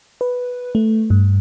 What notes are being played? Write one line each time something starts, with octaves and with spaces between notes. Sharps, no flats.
B4
A3
G2